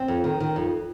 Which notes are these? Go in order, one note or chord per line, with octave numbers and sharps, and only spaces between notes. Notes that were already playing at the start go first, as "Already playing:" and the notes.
Already playing: C4
F2
D#3
D#3
F2